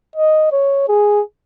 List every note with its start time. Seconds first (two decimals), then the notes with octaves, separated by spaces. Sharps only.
0.16 D#5
0.52 C#5
0.88 G#4